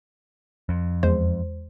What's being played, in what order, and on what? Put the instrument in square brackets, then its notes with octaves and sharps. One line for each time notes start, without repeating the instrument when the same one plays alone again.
[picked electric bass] F2
[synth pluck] E2 G#3 C5